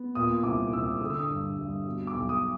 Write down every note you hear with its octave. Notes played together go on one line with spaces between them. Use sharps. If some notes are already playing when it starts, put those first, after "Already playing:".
Already playing: B3
A#2 D#6
C2 D6
C2 E6
D3 D#6
E6
D#6
G2
G2
B2
D6
B1
D#6